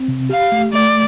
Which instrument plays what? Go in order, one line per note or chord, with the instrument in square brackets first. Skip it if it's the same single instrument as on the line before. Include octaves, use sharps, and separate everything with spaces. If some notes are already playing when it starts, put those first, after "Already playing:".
Already playing: [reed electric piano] C4
C3
[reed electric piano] G4 [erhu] F5
[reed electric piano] A3
[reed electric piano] A3 [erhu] D5